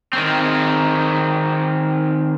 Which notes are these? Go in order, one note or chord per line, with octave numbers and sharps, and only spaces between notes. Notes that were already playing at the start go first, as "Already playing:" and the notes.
D#3 C4